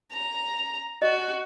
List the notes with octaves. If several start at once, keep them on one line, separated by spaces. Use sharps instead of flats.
A#5
F#4 D#5